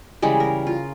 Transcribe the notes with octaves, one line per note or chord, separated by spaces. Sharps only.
C#3 E3 G3 G#3
A#4
F4